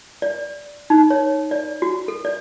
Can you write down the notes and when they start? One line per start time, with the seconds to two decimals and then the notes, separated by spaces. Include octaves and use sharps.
0.22 D5
0.90 D#4
1.10 C#5
1.51 D5
1.82 F#4
2.08 A4
2.25 D5